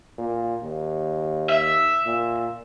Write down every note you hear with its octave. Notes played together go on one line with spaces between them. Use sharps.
A#2
D#2
E5
A#2